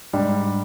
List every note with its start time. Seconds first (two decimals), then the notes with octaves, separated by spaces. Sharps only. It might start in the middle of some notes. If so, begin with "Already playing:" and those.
0.13 G#2 G3 D4